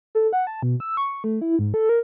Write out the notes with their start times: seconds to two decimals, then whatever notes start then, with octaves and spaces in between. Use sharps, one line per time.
0.15 A4
0.33 F#5
0.47 A5
0.63 B2
0.80 E6
0.97 C#6
1.24 A3
1.41 E4
1.59 G#2
1.74 A4
1.89 A#4